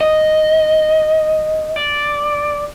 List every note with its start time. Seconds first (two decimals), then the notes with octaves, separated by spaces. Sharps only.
0.01 D#5
1.76 D5